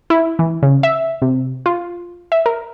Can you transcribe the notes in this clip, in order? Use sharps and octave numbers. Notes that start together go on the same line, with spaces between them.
E4
E3
C#3
E5
C3
F4
E5
A#4